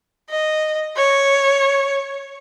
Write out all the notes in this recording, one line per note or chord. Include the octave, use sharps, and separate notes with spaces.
D#5
C#5